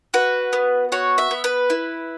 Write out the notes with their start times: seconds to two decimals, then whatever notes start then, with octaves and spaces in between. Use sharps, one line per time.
0.14 F#4 B4
0.53 B3
0.92 F#4 C#5
1.18 E5
1.31 B3
1.44 B4
1.70 E4